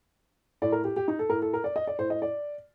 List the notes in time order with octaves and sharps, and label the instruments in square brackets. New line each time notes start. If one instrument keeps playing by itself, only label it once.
[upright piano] A2 D5
A#4
G4
G4
D#4
A4
A2 A#4
A4
A#4
D5
D#5
D5
A2 C5
D#5
D5